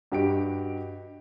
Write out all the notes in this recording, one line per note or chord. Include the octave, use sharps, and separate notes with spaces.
G2 F#4 G4 D#5 D7